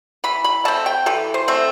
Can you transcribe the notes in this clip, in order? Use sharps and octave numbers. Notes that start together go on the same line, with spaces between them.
E3 B5
B5
A3 C4 A5
G5
E3 A4
C5
A3 C4